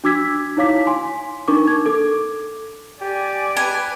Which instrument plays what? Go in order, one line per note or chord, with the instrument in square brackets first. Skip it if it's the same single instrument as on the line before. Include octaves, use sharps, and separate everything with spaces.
[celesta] D4 F#4 D6 E6 G#6 B6
D#4 E4 C#5 F5 D6 B6
G#5 C6
D4 D#4 A#4 C#6 D6
G#6
A4 D6
[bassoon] G4 [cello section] D5 [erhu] G#5
[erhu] B4 [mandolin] G#5